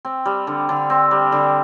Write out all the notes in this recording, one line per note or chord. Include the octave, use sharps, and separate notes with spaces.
C4
G3
D3
D3
C4
G3
D3